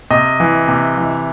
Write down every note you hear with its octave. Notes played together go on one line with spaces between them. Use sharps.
C3 D#5
E3
C3
E3